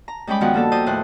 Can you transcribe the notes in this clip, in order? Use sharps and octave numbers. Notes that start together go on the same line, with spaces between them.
A#5
G3 G#3 C#4 G5 B5 D6
G2 D#3 F3 B3 F#4 F#5
G3 A#3 A4 D5
F3 C5 D5 G5 D#6
D#2 A2 C5 F#6